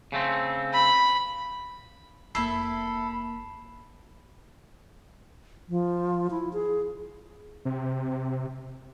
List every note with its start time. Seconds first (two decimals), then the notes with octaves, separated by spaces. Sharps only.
0.12 C#3 A3 C4
0.73 B5
2.35 F1 A#3 E4 A4 B5 C7
5.69 F3
6.31 E4
6.53 G#4
7.65 C3